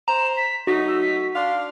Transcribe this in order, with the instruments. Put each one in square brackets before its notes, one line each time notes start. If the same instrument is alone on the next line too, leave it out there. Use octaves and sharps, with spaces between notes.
[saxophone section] C5 [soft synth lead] A#5 [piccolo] E7
[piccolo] B6
[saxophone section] F#3 A3 D#4 [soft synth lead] F#4 [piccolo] B6
[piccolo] E6
B6
[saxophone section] D4 F5 [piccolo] C6